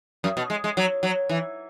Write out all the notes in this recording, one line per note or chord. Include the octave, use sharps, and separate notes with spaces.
F#2
B2
G#3
G#3
F#3
F#3
E3